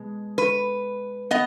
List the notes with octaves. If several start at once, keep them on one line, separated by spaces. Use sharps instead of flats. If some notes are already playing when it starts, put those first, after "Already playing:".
Already playing: B2 G#3
B4
B3 D#5